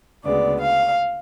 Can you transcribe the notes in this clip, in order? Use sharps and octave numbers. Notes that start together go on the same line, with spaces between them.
D2 C#3 G#3 B3 D5
F5